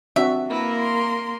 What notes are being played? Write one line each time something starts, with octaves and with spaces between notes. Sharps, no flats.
C4 D4 F#4 E5
A#3 E4 A#4 B4
C6